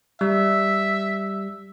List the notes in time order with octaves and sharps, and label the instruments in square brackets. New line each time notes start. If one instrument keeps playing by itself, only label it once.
[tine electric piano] G3 [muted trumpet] E5